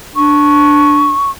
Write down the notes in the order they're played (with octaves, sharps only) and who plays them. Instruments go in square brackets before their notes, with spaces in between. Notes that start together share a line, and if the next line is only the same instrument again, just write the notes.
[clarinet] D4 [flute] C#6